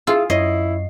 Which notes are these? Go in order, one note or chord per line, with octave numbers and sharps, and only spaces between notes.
E4 F4 G#4 F5 E6
F#2 E4 C#5 D#5 C7